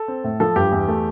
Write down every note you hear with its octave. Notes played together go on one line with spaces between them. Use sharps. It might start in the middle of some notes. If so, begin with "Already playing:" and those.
Already playing: A4
C4
A2
F3 A4
G2 G4
E2
A3